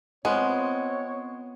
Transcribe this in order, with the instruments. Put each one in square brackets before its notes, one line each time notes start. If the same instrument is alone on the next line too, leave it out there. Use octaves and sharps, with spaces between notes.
[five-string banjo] G#3 [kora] B3 F4 [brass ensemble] C4 [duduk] C#5